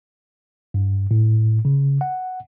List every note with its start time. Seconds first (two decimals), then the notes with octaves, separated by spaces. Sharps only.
0.74 G2
1.11 A2
1.65 C#3
2.01 F#5